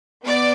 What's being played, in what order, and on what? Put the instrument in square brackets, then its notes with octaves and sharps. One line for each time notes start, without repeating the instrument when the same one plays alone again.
[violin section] B3 D5